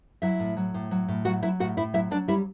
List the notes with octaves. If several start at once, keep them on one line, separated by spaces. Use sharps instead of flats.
F#3 E4 E5
A2
F#3
A2
F#3
A2
F#3 F#4 F#5
F#3 E4 E5
A2 F#4 F#5
A2 E4 E5
F#3 E4 E5
F#3 D4 D5
G3 E4 E5